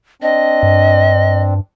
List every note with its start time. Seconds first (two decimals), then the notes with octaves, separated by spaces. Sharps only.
0.22 C4 D4 D#5
0.63 G2